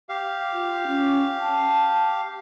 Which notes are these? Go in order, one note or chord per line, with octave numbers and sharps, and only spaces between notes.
G4 F5
F4
C#4
A5